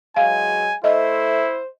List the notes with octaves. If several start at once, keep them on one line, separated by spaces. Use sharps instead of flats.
G#2 E3 F#3 G#3 F5 G#5
A3 E4 C5 D#5